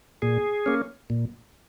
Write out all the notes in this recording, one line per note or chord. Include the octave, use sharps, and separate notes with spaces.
A#2 G#4
A#3 C#4
A#2